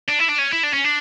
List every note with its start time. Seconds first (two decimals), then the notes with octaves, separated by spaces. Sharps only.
0.08 D4
0.19 E4
0.28 D4
0.38 C#4
0.52 E4
0.63 D4
0.73 C#4
0.84 D4